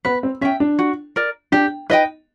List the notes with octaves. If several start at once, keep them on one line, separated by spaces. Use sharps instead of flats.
B3 B4
C4
C#4 E5 G5
D4
F#4
A#4 D5
D4 G4
D#4 B4 D#5 G5